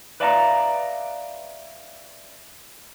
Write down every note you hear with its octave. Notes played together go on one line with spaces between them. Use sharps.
B4 D5 E5 F5 G#5 A#5